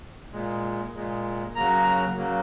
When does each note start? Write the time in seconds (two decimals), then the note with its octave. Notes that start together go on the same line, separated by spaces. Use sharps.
0.31 A#2 G#3
0.93 A#2 G#3
1.55 C#3 F#3 A#3 A#5
2.17 C#3 F#3 A#3